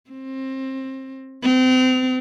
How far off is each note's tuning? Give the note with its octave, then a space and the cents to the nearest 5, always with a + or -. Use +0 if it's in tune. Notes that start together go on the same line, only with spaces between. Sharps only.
C4 +25
C4 -35